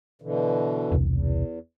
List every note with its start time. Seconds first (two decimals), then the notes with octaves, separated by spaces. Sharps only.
0.22 B2 D3 E3
0.92 E1 C2
1.08 E2